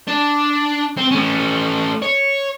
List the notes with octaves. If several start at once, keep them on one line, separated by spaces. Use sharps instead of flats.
D4
C4
A3 C#4
C#5